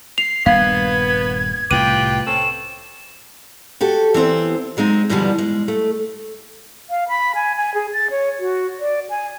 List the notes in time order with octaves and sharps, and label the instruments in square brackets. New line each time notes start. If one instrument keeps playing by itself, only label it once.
[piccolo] C7 [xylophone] F7
[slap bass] D#1 G2 A#3 [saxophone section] B3 [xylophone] F5 [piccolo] G#6
[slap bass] C2 A2 C3 [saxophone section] F4 G4 B4 [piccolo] G5 [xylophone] D#7
[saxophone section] C4 C#4 A4 [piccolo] E7
[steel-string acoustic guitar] F#4 G4 A4
E3 B3 C4 C5
F#3 G#3 C4 D#4
G2 B2 D3 E3 F3 G3
G#3
A3
[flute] F5
B5
G#5
G#5
G#4
A6
C#5
F#4
D5
G#5